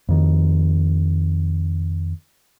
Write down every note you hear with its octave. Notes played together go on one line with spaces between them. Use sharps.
F2 D#3